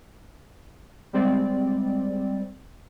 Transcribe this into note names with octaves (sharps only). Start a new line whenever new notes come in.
G3 G#3 C4 D5